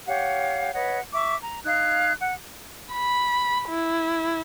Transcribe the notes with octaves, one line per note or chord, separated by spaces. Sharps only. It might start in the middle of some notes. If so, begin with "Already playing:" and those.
G4 C#5 F5 F#5
B4 C#5 D#5 F#5
E5 C#6 D6
A#5
D#4 F5 F#6 G#6
F#5
B5
E4